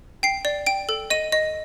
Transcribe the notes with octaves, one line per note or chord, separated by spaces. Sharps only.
G5 C7
D5
G5 D7
A4
D#5 D#7
D#5